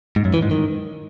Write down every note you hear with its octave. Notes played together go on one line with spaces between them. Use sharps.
G#2
F#2
E3
G#2
D#3